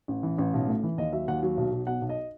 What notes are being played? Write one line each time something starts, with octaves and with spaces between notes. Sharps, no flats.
A1
E3
A1
B1
A2
E3
D#2 D#5
F#3 E5
D#2 F#5
F#3
B1
B1
B2 F#5
B1
D#5